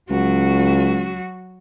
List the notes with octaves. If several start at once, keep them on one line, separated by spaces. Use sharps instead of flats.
C#2 F#3 F#4